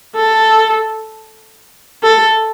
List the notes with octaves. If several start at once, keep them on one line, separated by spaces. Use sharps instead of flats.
A4
A4